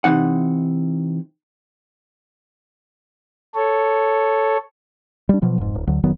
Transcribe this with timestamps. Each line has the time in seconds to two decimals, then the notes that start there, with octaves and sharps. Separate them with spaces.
0.04 C3 E3 D#4 F#5
3.55 A4 C#5
5.29 G3 D4
5.42 B2 F3 F#3
5.58 F1 G#2
5.75 D1
5.87 D2 D3 F#3
6.03 F1 D#3 F#3 B3